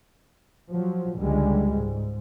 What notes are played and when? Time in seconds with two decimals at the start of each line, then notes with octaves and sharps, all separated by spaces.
0.70 F3 F#3
1.17 C#2 D3 G3 G#3
1.75 G#2